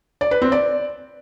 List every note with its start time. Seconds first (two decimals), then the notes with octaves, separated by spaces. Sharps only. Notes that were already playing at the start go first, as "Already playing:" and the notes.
0.21 D5
0.31 B4
0.42 C4
0.52 D5